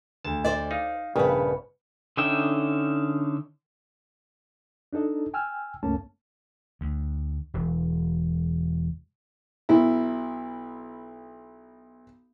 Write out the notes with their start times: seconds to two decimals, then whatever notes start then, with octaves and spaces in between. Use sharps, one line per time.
0.25 D2 A5
0.44 C5 D5 D#5
0.71 D#4 F5
1.16 A#1 G2 C#3 B3 B4
2.17 D3 C#4 D#4 E5 G5
4.93 D4 D#4 A4 D#5
5.34 G5 G#5 E6 F6
5.83 C#2 G2 A3 A#3 C#4 A5
6.81 D2
7.54 E1
9.69 B1 B2 E4